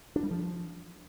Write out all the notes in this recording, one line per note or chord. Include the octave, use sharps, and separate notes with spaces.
D4
G3
F3